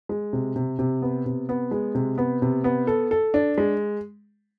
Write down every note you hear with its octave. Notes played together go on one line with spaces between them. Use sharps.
G#3
C3
C3
C3
B3
C3
B3
G#3
C3
B3
C3
B3
A4
A4
D4
G#3